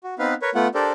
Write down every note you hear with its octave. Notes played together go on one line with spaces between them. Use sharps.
F#4
B3 C4 D#4 B4 F5
A#4 B4 C#5
A3 B3 F4 F#5
D4 G4 A4 A#4 C5 D5